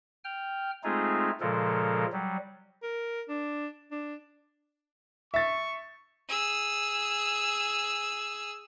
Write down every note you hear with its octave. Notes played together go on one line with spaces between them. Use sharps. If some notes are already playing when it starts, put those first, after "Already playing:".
G5 F6
G#3 A3 C4 D#4 F4 G#4
A#2 C#3 F3 G#3 A4 A#4
F#3 G3
A#4
D4
D4
E5 C#6 A6
G#4 E6